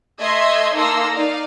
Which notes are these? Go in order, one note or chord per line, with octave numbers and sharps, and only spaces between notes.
A3 D#5 E5 C6 G#6
A#3 D#4 A4 C6 E6 A#6
D#4 D5 F5